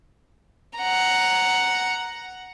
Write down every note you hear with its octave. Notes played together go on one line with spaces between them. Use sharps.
F#5 A#5